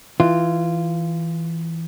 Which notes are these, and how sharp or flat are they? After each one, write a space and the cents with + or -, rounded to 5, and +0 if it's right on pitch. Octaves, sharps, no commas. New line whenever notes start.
E3 +0 F4 -15